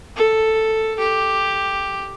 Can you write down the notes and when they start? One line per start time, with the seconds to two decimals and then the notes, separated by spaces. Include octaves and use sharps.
0.16 A4
0.99 G4